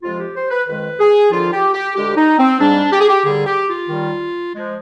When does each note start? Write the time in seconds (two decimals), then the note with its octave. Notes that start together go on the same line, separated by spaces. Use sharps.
0.03 F2 C3 F3 G#3 F4
0.19 G4
0.35 C5
0.50 B4
0.67 F2 D#3 G#3 B4
1.00 G#4
1.31 D#2 D3 F3 F4
1.53 G4
1.74 G4
1.95 D2 D3 G#3 G4
2.16 D#4
2.39 C4
2.60 G#2 G3 D4
2.92 G4
3.00 G#4
3.09 G4
3.24 D#2 D3 G3 G#4
3.46 G4
3.68 F4
3.89 D#2 D#3 G3
4.53 F3 G#3